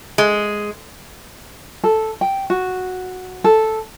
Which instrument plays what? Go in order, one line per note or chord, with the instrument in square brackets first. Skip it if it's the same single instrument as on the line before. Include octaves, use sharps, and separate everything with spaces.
[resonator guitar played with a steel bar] G#3
[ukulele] A4
G5
F#4
A4